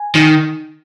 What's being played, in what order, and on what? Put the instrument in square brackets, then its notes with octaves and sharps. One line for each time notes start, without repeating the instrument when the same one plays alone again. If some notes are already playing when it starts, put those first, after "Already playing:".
Already playing: [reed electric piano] G#5
[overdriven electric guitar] D#3